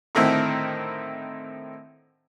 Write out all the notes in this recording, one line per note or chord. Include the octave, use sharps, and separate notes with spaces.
A2 D3 D#3 C4 E4